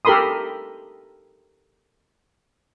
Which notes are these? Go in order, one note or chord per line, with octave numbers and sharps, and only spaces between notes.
G4 A4 A#4 B5 C6 D#6